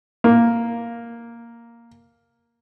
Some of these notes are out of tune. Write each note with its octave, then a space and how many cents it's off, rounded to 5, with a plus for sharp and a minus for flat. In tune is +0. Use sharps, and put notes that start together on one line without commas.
A#3 +0